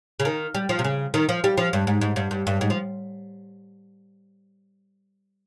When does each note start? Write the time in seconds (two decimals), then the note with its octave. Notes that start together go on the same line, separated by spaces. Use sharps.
0.20 C#3
0.25 D#3
0.55 G3
0.69 F3
0.79 C3
0.84 C#3
1.14 D#3
1.29 F3
1.44 G3
1.58 F3
1.73 G2
1.87 G#2
2.01 G#2
2.16 G2
2.31 G2
2.47 G2
2.61 G#2
2.70 F3